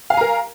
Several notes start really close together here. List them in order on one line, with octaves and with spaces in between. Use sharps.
F5 G#5 A#5 A#4